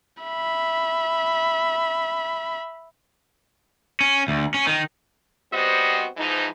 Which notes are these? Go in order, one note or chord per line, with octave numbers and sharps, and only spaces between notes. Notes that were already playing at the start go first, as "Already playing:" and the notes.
E5 B5
C#4
D2
C#4
D#3
G3 B3 C4 F#4 C5 D#5
G#2 E3 F3 D#4